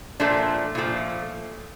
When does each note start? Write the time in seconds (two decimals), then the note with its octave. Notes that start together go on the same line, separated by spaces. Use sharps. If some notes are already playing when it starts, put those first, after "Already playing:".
0.20 A#2 F3 A3 D4
0.75 A#2 F3 A3